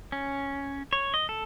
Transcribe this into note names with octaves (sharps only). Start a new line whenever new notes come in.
C#4
C#5
D#5
A4